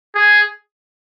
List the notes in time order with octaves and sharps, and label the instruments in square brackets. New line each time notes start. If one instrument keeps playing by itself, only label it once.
[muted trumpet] G#4